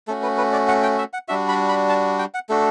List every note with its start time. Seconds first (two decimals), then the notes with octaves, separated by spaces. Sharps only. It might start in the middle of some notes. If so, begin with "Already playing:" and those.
0.07 A3 C#4 F#4 A4
0.22 B4
0.38 B4
0.53 D5
0.68 F#5
0.83 G5
0.98 E5
1.13 F#5
1.28 G3 D4 F#4 E5
1.49 B5
1.69 B5
1.89 A5
2.19 G5
2.34 F#5
2.49 A3 D4 F#4 A4